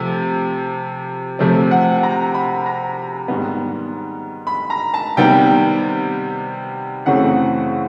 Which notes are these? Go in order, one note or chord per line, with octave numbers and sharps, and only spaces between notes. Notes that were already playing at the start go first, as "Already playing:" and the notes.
Already playing: C3 F3 A3
C3 F3 A3 C4
F#5
A#5
B5
A#5
G#2 D#3 G3 B3
B5
A#5
A5
C3 D#3 G3 B3 G5
F#2 C#3 E3 A3 C4 F#5